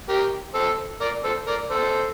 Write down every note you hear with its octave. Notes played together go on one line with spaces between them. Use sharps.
G4 A#4
A4 C5
A#4 D5
A4 C5
A#4 D5
A4 C5